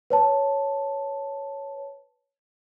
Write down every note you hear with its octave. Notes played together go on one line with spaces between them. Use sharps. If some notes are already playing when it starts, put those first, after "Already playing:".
B4 C#5 A5